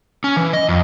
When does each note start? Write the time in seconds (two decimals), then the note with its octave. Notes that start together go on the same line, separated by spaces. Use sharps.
0.24 C#4
0.36 E3
0.53 D#5
0.69 F2